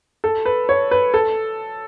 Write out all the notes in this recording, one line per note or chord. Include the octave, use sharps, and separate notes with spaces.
A4
B4
C#5
B4
A4